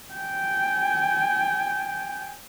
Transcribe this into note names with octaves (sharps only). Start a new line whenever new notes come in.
G5 G#5